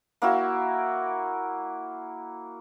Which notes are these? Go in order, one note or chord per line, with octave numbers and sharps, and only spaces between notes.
A#3 E4 F#4